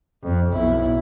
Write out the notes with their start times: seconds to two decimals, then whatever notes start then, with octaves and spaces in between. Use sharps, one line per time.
0.23 F2
0.53 B1 E4